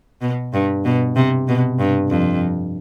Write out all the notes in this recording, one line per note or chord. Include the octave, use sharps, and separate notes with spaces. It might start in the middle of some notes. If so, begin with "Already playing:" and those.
B2
G2
B2
C3
B2
G2
F2